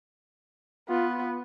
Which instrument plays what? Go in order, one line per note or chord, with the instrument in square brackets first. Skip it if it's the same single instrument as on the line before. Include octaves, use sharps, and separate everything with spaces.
[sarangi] B3 [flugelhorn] F4